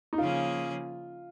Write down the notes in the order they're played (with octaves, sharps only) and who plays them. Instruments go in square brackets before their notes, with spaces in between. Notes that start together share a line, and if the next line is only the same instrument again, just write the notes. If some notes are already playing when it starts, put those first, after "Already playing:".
[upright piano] D#4
[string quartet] C#3 F3 A#3 C#4 G#4 [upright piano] F4